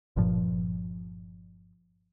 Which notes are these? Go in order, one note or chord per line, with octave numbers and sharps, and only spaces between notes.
G1 G2 A#2 F3